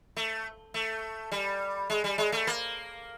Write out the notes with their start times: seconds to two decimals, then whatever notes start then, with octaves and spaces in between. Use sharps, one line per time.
0.16 A3
0.74 A3
1.32 G3
1.90 G#3
2.04 G3
2.18 G#3
2.32 A3
2.47 A#3